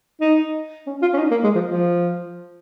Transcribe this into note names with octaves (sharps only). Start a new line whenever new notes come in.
D#4
C#4
F4
C#4
D#4
A#3
G#3
F3
F3